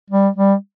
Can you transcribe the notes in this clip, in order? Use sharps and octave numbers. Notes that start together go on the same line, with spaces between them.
G3
G3